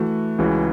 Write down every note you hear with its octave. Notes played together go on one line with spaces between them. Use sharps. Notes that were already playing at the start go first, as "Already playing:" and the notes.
Already playing: E3 A3 F#4
C#2 C#3 E3 C#4 F#4